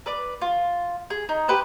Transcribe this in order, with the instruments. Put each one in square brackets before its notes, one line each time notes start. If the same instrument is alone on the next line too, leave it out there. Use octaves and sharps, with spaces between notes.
[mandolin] B4 D5
F4
G#4
D#4
G4 B4 C5